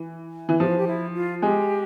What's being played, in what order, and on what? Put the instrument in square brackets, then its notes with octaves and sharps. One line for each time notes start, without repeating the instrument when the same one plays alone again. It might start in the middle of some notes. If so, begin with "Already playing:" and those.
Already playing: [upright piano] E3
E3
[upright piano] F3 [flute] G4
[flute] F4
G4
E4
F4
[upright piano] G#3 [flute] G4